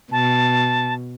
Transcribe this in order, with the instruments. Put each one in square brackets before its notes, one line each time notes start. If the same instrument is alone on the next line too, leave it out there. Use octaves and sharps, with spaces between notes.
[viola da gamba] B2 [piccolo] A5